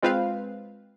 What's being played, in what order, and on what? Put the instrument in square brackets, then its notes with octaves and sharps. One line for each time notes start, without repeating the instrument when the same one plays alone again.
[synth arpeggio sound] G#3 C4 F4 B4 C5 F5